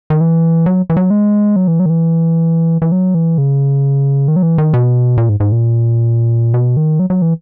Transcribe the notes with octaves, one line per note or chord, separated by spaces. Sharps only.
D#3
E3
F#3
E3
F#3
G#3
F#3
E3
F#3
D#3
E3
E3
F#3
E3
C#3
D#3
F#3
E3
D#3
B2
A#2
G#2
G#2
A#2
B2
D#3
F#3
F#3
E3